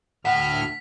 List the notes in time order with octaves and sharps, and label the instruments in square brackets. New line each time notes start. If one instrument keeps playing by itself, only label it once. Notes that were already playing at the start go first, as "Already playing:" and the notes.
[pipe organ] D2 F6 [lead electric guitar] A2 [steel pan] F#5 [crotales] B6